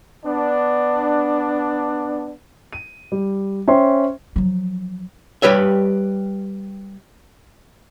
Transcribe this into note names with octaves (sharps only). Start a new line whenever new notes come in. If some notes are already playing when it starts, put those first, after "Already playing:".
B3 D4
D#7
G3
C#4 C5 E5 G5 C6
F3 F#3
G3 G4 B4 C#5 E5